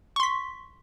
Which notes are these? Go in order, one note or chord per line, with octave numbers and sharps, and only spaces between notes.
C6 C#6 B6